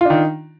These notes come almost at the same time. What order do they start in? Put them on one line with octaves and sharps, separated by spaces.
F4 D4 D#3